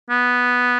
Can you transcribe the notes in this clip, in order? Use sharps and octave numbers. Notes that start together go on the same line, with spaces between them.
B3